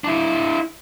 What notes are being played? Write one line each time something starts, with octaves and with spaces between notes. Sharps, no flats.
D4 E4